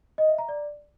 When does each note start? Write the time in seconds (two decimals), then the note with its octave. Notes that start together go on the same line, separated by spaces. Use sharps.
0.18 D#5
0.28 E5
0.38 A#5
0.49 D5